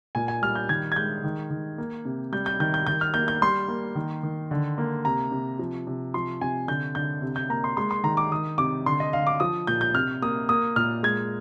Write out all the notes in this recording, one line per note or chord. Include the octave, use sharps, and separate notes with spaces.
A#2 G#5
G#5
G3 F6
G6
D#3 G#6
G#6
G#3 G6
D#3
D#3
A#3
C3
G3 G6
G6
D#3 G6
G6
D#3 G6
F6
A#3 G6
G6
G3 C6
A#3
D#3
D#3
D3
A#3
C3 A#5
C3
F3
C3
F3 C6
C3 G#5
D3 G6
D3 G6
C3
G6
A#3 A#5
C6
G#3 C6
C6
D#3 A#5
D6
D#3 D#6
C3 D6
D3 C6
D#5
D3 F5
D6
F3 D#6
A#2 G6
G6
C3 F6
A#3 D#6
A#3 D#6
A#2 F6
G#3 G#6